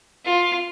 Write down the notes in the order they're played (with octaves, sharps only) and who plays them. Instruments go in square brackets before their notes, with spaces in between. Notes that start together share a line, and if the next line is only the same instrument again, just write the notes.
[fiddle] F4